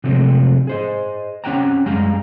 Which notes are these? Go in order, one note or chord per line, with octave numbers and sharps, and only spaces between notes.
C3 F3 F#3 G#3 A3 C4
G#4 C5 D#5
C4 C#4 G4 F#5 G5 A#5
F#2 G3 G#3 F5 A#5